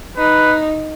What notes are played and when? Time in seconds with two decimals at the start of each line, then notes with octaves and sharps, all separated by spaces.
0.17 D#4 B4